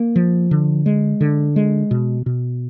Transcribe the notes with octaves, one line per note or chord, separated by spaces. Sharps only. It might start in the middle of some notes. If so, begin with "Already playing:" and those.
Already playing: A#3
F3
D3
G#3
D3
G#3
B2
B2